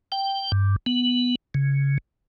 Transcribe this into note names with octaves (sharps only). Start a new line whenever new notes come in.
G5
G2
B3
C#3